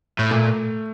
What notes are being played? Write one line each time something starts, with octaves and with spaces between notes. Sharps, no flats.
A2
A#2 A3